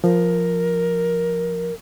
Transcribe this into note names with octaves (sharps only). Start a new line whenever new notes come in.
F3 A#4